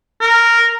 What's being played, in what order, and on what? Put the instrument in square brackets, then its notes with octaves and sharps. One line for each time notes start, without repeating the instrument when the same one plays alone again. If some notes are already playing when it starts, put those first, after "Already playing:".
[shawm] A#4